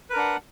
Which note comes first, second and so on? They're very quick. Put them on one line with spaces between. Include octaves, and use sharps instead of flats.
B4 A#4 D4 F#5